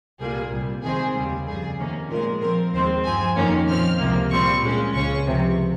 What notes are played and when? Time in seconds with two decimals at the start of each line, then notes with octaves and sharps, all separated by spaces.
0.20 C2 A#2 G3 A#3 G#4
0.52 C2 A#2 G3
0.83 C3 D#3 G#3 C4 G#4
1.15 D#2 C#3 G3
1.46 F2 C#3 G3 G#4
1.78 C3 D#3 A#3 C#4
2.09 A#2 F3 G#3 A#4
2.41 A#2 F3 C4 A#4
2.73 D#2 D#3 G#3 C4 C5
3.05 G2 F3 C4 G#5
3.36 F2 D#3 A#3 C#4
3.67 A#2 F3 C4 F6
3.99 C#2 C3 F3 A#3
4.31 A#2 G3 C4 C#6
4.62 A#2 G#3 C#4
4.94 C#2 C#3 G#3 C#4 C#6
5.26 C#2 C3 F3